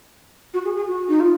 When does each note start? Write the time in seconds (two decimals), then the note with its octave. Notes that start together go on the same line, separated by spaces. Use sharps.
0.54 F#4
0.65 G#4
0.76 G#4
0.87 F#4
1.08 D#4
1.20 F4